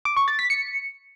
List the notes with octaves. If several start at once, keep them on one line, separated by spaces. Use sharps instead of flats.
D6
C#6
A6
B6
C#7